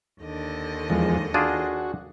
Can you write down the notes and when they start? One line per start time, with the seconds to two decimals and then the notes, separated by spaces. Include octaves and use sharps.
0.22 D#2 D3 D#5
0.90 E2 F3 G#3
1.34 D4 F4 F#4 G#4